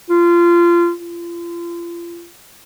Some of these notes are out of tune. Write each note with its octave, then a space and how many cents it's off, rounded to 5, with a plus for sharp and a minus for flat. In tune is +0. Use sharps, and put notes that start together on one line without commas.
F4 -25
F4 -35